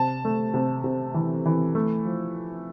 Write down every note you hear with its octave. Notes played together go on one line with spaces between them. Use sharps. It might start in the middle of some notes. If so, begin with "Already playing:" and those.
Already playing: C3 A5
A3
C3
C3
E3
E3
A3
F3